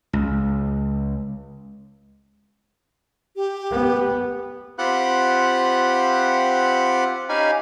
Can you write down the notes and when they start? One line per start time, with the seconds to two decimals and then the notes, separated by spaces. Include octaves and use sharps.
0.13 C#2
3.36 G4
3.71 B3
4.79 C4 F4 G4 F#5 B5 F#6
7.29 C#4 D#4 G4 F5 G#5 B5